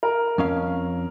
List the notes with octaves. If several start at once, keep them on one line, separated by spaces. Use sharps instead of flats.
A#4
F2 C#4 F5